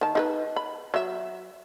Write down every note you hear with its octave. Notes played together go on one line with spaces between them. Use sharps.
D#3 A5
D#4 G#4 B4
B5
F#3 E5